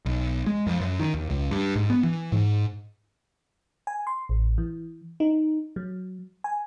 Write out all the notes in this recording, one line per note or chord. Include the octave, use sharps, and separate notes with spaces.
B1
G#3
F2
F#2
D#3
D#2
C#2
G2
G#2
B3
E3
G#2
G#5
C6
A1
E3
D#4
F#3
G#5